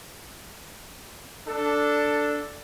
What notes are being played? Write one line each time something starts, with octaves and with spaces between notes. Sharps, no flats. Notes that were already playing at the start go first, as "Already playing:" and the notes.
D4 A4